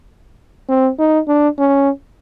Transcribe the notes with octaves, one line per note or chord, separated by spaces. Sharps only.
C4
D#4
D4
C#4